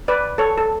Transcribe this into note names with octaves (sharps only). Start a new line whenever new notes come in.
B4 D5
A4 C#5
A4